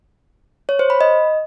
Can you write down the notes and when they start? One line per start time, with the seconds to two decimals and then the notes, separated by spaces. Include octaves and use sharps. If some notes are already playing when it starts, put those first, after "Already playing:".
0.69 C#5
0.79 C5
0.90 B5
1.01 D#5